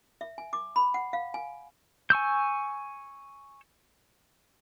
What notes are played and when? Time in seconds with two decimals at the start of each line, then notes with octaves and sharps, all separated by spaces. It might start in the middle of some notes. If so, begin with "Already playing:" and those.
0.21 E5
0.38 G#5
0.53 D6
0.76 B5
0.94 F#5
1.13 F5
1.34 G#5
2.10 G#5 C#6 E6 G6